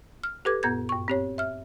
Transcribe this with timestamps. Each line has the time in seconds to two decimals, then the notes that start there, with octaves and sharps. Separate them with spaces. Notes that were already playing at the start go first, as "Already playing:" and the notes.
0.24 F6
0.45 G4 A4 B4 D6 G#6
0.63 F#2 A#2 B3 G6 G#6
0.89 G2 C#6
1.08 C4 G4 C#5
1.38 E5 F6